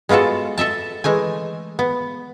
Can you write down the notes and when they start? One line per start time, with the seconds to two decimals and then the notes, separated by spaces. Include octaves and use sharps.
0.09 G#3 B3 F4 F#4 A4
0.58 A4 D#5 E5 A5
1.04 E3 G#3 A3 G#5
1.79 B3